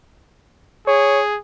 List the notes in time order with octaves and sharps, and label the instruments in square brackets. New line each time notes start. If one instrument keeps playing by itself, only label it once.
[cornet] G#4 [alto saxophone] C#5